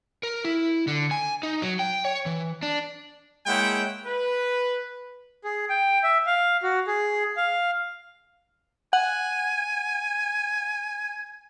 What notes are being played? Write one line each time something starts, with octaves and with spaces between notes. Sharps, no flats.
A#4
E4
D3
G#5
D#4
F#3
G5
C#5
E3
D4
G#3 A#3 E4 C#5 F#5 G5
B4
G#4
G5
E5
F5
F#4
G#4
F5
F#5 G#5